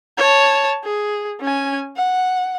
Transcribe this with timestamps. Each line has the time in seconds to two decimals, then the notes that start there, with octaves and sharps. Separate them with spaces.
0.18 C#5 A5
0.84 G#4
1.41 C#4 G#5
1.96 F#5